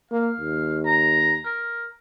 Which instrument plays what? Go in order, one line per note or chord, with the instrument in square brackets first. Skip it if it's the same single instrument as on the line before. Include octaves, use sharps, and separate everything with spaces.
[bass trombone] A#3 [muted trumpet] F5
[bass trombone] D#2
[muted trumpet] A#5
A#4